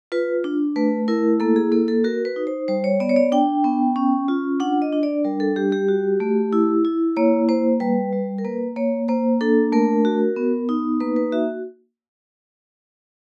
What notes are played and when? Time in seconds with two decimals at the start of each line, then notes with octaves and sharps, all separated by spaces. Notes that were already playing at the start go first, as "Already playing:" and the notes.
0.12 F4 B4
0.44 D4
0.76 A3 B4
1.08 E4 A#4
1.40 A#3 A4
1.56 G#4
1.72 A#3 A4
1.88 A4
2.04 F#4 A#4
2.25 B4
2.36 D#4
2.47 C5
2.68 G3 C5
2.84 C#5
3.00 B3 D5
3.09 C#5
3.16 D5
3.32 D4 G5
3.64 B3
3.96 C#4
4.28 F4
4.60 D4 F#5
4.82 D#5
4.93 D4
5.03 D5
5.25 G3 A#4
5.40 A4
5.56 G3 G4
5.72 G4
5.88 F#4
6.20 A3
6.53 E4
6.85 E4
7.16 A#3 C#5
7.49 A#3 C5
7.80 G3 B4
8.13 G3
8.38 A#4
8.44 A#3 B4
8.76 A#3 C#5
9.08 A#3 C5
9.41 D4 A4
9.72 A3 A#4
10.05 F#4
10.36 B3
10.69 D#4
11.01 A#3 B4
11.16 B4
11.32 F#4 E5